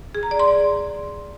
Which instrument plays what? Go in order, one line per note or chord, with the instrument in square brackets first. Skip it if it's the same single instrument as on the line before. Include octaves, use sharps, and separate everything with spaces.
[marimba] G#4
A#5
D5
C6
D5